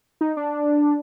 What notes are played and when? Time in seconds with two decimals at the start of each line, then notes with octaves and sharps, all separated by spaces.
0.21 D#4
0.37 D4